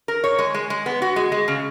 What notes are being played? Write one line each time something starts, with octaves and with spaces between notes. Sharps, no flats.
A#4
C#5
G#3
G#3
G#3
B3
F#4
G#3
G#3
C#3